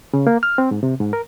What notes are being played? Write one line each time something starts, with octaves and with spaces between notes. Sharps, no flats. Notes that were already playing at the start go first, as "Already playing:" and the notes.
C#3
A#3
F6
C4
G#2
C3
G#2
A#4